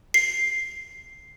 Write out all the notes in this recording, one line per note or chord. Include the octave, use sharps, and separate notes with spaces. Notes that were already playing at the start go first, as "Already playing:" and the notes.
C7